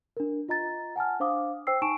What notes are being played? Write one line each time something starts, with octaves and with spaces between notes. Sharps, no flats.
D4 A#4
F4 D#5 A#5 A6
F#5 G#5 A5 F6
D4 C5 F5 D6 D#6
C5 G5 E6 C7
D#4 G#5 A5 C#6 D7 E7